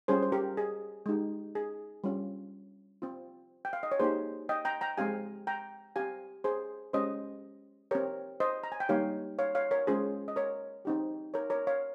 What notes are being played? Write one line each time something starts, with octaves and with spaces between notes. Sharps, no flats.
G3 C#4 F4 G#4 C5
C5
G4 A#4
G#4
G#3 D#4 G4
G#4
G3 C#4 F4
C4 F4
G5
F5
D#5
C#5
A#3 D#4 G4 G#4 C5
D#5 G5
G5 A#5
G5 A#5
G#3 C4 G4 F5 G#5
G5 A#5
C4 G4 F5 G#5
G#4 C5
G#3 C#4 G4 C5 D#5
C4 G4 A#4 C#5
C5 D#5
A#5
G#5
G5
G3 A#3 D#4 G4 C#5 F5
C#5 F5
C#5 F5
A#4 C#5
G#3 C#4 F4 G#4 C5
D#5
A#4 C#5
C4 D#4 G4
A#4 C#5
A#4 C#5
C#5 F5